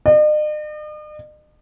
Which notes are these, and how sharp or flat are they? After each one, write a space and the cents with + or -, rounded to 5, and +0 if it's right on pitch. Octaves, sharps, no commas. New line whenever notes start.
D#5 -45